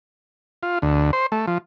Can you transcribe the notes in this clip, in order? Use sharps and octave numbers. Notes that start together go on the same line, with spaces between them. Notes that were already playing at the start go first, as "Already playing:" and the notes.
F4
D2
C5
A3
F3